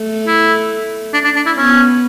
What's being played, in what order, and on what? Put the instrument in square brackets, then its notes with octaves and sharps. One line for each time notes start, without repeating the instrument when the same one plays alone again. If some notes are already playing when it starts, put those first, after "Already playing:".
Already playing: [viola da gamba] A3
[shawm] E4
D4
D4
D4
E4
[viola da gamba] B3 [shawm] C#4